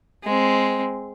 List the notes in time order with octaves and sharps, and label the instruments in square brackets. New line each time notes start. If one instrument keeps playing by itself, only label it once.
[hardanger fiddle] G#3 C4